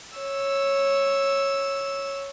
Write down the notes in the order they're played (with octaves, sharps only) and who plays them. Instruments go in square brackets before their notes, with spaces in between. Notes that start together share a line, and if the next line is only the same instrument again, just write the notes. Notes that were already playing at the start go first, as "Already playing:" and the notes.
[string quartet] C#5 E6